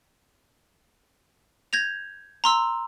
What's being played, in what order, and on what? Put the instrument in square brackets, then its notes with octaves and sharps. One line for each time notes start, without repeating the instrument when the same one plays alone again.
[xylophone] G6 G#6 A#6 F7
A#5 C6 E6